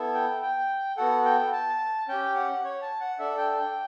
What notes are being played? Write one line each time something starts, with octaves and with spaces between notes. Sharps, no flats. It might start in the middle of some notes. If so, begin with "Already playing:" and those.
Already playing: B3 E4 A4
G5
G5
B3 F#4 A4 F#5
G5
A5
C#4 G4 G5
F#5
C#5
A5
F#5
D4 A4 E5
G5
G5